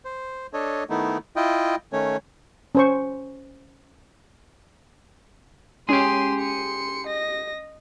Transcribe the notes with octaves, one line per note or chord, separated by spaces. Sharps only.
C5
D4 A4 C#5 D#5
D#3 A3 B3 D#4 E4
E4 F4 D#5 G5
D#3 A3 C#4 C#5
C#4 C5 C#6
G#3 C#4 G4 G#4 C6
C6 C#7
D#5 A#6